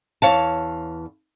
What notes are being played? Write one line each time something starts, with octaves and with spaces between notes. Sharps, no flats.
E2 C#5 F5 A5